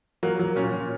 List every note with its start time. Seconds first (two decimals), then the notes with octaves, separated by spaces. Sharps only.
0.23 F#3 A#3
0.39 F#3
0.56 A#2 C#4
0.73 A#2